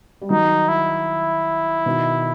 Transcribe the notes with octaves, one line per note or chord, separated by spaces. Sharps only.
G3
D#3 F#3 D#4
E4
B2 D#3